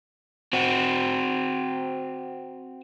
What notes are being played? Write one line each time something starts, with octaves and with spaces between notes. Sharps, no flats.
C4 F#4